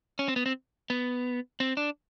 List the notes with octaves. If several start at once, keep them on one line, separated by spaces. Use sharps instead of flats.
C#4
C4
B3
C4
B3
C4
D4